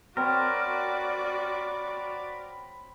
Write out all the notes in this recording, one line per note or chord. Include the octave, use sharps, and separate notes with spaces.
C4 F#4 A#4 C#5 D5 B5